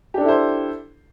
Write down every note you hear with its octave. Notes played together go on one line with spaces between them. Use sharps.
D4 E4 G4 A4 C5